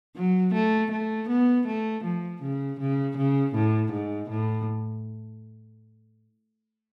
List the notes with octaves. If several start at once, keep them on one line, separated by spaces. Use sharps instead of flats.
F#3
A3
A3
B3
A3
F3
C#3
C#3
C#3
A2
G#2
A2